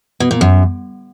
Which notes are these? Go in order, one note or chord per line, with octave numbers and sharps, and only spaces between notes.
B2
A#2
F#2